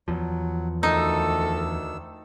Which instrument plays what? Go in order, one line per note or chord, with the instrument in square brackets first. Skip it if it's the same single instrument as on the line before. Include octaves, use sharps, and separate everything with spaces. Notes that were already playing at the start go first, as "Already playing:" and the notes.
[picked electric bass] E2 F3 [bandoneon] F#3
[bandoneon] D2 D#3 E6 [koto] D#4 [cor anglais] A4